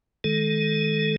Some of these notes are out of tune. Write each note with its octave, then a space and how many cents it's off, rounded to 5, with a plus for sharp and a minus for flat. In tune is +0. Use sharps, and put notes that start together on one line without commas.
D#3 +10 G#3 +30 A4 -15